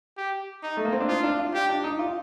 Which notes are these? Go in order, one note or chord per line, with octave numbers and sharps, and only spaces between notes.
G4
D#4
A3
A#3
C4
D4
D#4 F4
D4
F4
G4
D4
D#4
F4